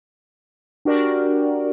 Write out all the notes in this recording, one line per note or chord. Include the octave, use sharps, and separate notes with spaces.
D4 F#4 G4 A#4 D5